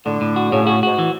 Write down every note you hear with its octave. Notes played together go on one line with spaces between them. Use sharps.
A2 D3
A2
F#4
A2 C#3
C#3 F#4
G#2 F#4
E3